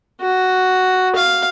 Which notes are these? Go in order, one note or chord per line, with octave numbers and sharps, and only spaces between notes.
F#4
F5